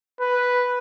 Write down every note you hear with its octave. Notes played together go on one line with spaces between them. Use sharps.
B4